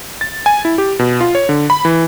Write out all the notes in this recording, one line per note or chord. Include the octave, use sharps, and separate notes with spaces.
A6
G#5
E4
G4
B2
F4
C#5
D3
B5
E3